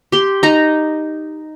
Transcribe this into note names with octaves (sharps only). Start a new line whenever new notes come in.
G4 C6
D#4 D#5 A#5